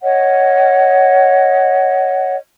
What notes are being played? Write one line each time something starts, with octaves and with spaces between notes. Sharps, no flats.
C#5 D#5 F#5